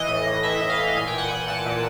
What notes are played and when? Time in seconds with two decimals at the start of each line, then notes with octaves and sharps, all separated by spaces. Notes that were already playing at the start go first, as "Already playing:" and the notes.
Already playing: E3 D#5
0.09 A2
0.26 A2
0.43 E3 E5
0.61 A2
0.70 F5
0.79 E3
0.96 A#2 G#5
1.08 G5
1.13 A#2
1.18 F#5
1.30 A#2 G5
1.48 A#2 A5
1.66 A#2